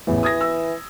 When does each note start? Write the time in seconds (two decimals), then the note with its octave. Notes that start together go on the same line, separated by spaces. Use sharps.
0.07 A1 E2 E3
0.23 D#6 G#6 A#6
0.41 E6